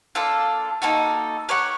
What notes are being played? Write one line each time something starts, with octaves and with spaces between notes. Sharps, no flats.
A#3 D4 F4 A4
A#3 D#4 F#4 A4
G4 A#4 C#5 F#5